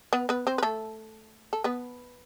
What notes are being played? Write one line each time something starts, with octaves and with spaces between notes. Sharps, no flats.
B3 B4
B3 B4
C4 C5
B4
A3 A4
A4
B3 B4